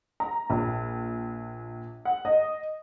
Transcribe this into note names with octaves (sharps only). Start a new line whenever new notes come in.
A#5
A#1
F#5
D#5